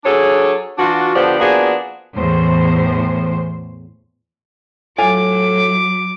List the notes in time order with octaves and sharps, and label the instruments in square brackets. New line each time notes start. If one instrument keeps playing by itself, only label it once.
[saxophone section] F#3 D4 G#4 A4 C#5
E3 D4 F4 F#4
D3 F3 B3 D4 G4 C5
F3 A#3 B3 D4 F#4 G#4
[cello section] E2 A2 C5
[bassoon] A2 [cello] F#3 [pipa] F4 F5 G#5 [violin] D6